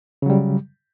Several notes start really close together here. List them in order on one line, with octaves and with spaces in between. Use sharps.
C#3 F#3 G3